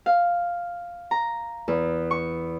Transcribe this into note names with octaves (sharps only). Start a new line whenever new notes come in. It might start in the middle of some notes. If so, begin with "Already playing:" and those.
F5
A#5
E2
C#6